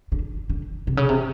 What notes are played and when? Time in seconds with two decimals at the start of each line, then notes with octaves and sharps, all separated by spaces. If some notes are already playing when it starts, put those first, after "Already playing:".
0.12 D3
0.50 D3
0.87 C3
0.97 C#3
1.09 C3